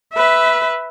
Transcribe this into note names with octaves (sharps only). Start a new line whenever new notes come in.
B4 E5